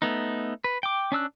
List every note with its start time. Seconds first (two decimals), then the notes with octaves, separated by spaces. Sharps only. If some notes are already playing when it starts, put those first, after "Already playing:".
0.02 A3 B3 D#4
0.64 B4
0.83 G5 D6
1.12 C#4 D4 E6 F#6